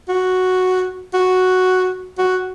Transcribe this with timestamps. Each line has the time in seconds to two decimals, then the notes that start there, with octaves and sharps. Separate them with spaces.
0.09 F#4
1.14 F#4
2.18 F#4